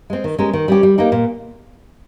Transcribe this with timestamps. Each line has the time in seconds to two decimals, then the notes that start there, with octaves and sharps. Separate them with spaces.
0.10 G#3 C4
0.24 D#3
0.38 G#3 C#4 G4 A#4
0.53 D#3
0.68 G3 C#4 G4
0.83 G3
0.98 A#3 D#4 G4
1.12 A#2